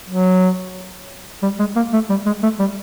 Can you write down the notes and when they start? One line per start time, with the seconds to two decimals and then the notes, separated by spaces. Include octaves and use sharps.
0.08 F#3
1.43 G3
1.59 G#3
1.76 A#3
1.93 A3
2.10 G3
2.26 G#3
2.43 A3
2.59 G3